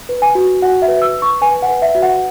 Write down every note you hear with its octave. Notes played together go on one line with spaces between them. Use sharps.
B4
G#5
F#4
F#4 F#5
E5
B4
E6
B4
C#6
B4 G#5
F#5
B4
E5
F#4
F#5